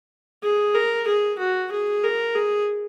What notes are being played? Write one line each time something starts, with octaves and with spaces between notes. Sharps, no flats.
G#4
A#4
G#4
F#4
G#4
A#4
G#4